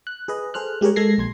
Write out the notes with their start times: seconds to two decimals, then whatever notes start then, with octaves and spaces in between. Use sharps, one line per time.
0.07 F#6
0.28 G#4 B4 D#5
0.54 G#4 A4 C5 F6 F#6
0.81 G#3 G4 G#4 A#4 C#5
0.96 G#3 A4 G#6 A#6 C7
1.18 A#1 C6 G#6